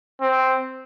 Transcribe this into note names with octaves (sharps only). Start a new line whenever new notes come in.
C4